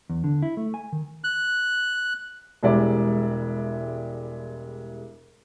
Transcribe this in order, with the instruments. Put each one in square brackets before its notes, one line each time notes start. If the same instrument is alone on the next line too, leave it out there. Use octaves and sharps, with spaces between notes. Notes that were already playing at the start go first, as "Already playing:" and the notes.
[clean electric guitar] E2
D3
E4
A3
G#5
D#3
[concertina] F#6
[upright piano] E1 G3 G#3 E4 D5